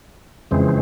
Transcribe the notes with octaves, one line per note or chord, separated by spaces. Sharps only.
F2 C#3 E3 G#3 C4